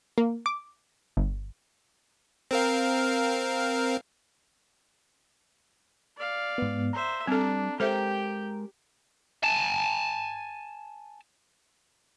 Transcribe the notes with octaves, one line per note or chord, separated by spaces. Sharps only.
A#3
D6
G1
C4 A#4 F5
D5 F5
G#2 B3
C5 E5 A#5
G3 C4 D4 A4
G#3 G4 A4 A#4 C5 E5 G5
G#5 A5